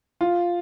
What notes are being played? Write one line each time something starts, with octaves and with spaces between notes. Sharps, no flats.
F4